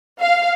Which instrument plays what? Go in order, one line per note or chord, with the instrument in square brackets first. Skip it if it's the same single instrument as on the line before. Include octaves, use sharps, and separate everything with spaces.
[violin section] F5